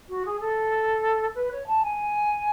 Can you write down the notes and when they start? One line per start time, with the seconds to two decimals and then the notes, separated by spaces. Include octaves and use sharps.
0.09 F#4
0.25 G#4
0.40 A4
1.35 B4
1.51 C#5
1.67 A5
1.83 G#5